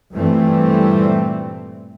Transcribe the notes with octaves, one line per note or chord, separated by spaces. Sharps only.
G2 A#2 E3 G3 A3 C4